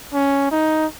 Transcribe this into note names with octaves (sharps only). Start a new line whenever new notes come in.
C#4
D#4